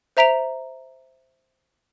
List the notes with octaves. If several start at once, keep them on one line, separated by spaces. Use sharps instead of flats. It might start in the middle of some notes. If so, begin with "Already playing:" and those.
C5 E5 A#5 B6 D7 F7